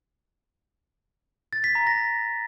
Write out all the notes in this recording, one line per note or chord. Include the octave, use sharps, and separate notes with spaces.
A6
B6
A#5
A#6